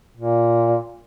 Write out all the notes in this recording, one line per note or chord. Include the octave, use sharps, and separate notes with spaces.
A#2